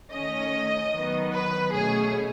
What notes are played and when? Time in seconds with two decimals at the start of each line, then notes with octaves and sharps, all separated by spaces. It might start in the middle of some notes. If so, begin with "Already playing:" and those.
0.11 D#3 A3 C#4 D#5
0.93 D#3 F#3 B3
1.32 B4
1.73 B2 A3 C#4 G#4